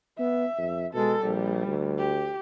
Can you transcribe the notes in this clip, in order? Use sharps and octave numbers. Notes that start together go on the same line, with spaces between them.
B3 E5
F2
B2 G#3 A4
A#1 G3
D2
G4